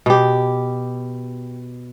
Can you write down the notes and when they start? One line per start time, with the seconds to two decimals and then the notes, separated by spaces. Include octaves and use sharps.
0.06 B2 G4